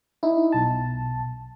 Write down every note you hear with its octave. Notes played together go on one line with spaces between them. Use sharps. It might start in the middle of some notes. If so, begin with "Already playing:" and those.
D#4 E4
B1 A5